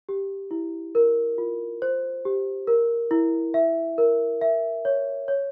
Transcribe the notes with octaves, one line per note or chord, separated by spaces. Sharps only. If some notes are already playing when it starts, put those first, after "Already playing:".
G4
E4
A#4
F4
C5
G4
A#4
E4
E5
A#4
E5
C#5
C#5